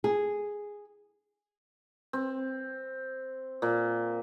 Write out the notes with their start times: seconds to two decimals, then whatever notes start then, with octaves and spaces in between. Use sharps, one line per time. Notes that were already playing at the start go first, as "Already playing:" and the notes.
0.04 G#4
2.13 C4
3.62 A#2